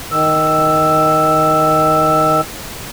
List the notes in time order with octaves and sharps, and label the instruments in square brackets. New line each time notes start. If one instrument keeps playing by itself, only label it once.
[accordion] D#3 E6